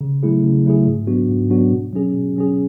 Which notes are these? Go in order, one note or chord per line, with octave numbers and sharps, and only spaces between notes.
C#3
F#3 A3 E4 G#4
C#3
F#3 A3 E4 G#4
G#2
F#3 B3 D4 F#4
G#2
F#3 B3 D4 F#4
B2
F#3 C#4 G#4
B2
F#3 C#4 G#4